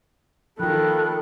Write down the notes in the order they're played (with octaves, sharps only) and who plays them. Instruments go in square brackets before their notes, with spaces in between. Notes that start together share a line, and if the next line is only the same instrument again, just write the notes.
[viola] D#3 [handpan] F3 F4 [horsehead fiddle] A4 [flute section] G5 B5 F#6